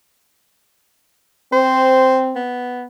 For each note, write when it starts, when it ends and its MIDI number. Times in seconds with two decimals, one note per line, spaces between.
1.53 2.39 60
1.53 2.20 72
2.36 2.84 59